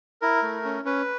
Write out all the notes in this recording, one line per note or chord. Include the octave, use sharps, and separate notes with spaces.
E4 A#4
A3
C#4
C#4 B4